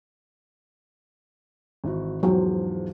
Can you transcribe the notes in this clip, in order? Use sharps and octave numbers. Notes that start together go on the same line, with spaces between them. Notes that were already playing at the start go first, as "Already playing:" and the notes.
G#1 E3 F#4
E2 G#2 F3 F#3